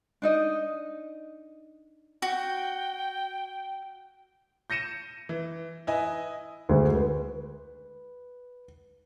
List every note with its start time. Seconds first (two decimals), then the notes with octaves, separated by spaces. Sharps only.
0.22 D4 D#4 D#5
2.22 F#4 G5
4.70 G6 A#6 C#7 D#7 E7
5.29 E3
5.87 E4 B4 D#5 G#5
6.69 D2 G#3
6.95 B4